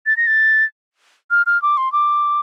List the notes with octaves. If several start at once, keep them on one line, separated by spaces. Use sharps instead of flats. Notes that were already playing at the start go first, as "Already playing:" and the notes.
A6
A#6
A6
F6
F6
D6
C6
D6